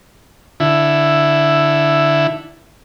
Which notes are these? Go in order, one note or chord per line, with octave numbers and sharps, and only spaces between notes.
D3 E4